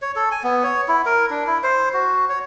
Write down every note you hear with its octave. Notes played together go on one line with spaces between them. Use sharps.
C#5
A4
G#5
B3
C#5
E4
A#4
D4
E4
C5
F#4
C#5